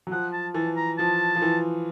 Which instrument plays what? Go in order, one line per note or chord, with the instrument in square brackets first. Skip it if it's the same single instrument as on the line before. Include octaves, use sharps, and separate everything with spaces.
[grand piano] F#3
[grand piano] F3 [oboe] F#5
[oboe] A5
[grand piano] E3 [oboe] A5
[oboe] A#5
[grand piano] F3 [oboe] A5
[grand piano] F3
E3